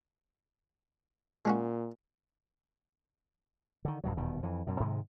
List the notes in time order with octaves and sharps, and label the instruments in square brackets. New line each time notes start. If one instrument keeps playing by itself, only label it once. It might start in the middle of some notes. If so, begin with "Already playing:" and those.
[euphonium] A#2 [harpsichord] G#3 C#4 F#4
[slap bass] D3 D#3
B1 G2 B2 F#3
D#1 E2 B2 D#3
F2 E3
F#2 B2
G#2 C3 D#3 G#3